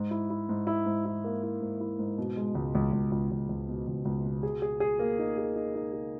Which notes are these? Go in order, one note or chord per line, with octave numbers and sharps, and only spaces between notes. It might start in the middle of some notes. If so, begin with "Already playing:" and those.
Already playing: G#2
E4
E4
G#2
E4
G#2
E4
A#3
E4
G#2
E4
G#2
B2
G#3
C#2
C#2
C#2
C#2
C#2
C#2
B2
C#2
C#2
B2
G#4
G#4
G#4
A#3
D#4
G#4
D#4
D#4
G#4